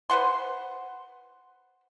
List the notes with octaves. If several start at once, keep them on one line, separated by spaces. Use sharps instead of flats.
B4 C5 F#5 C6